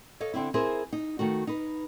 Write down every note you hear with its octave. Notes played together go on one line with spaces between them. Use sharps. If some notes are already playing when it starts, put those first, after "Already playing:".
A4 C#5 D#5 F5
D3 C4 C#4 E4
C4 E4 G#4 A#4 C5
D#4
D#3 A3 F#4
D#4 B4